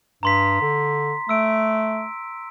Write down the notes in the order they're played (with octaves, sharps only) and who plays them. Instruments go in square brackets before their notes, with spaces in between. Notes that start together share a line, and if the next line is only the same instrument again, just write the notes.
[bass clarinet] G2 [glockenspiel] A#5 C6 B6
[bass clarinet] D3
[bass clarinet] A3 [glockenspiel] E6 D7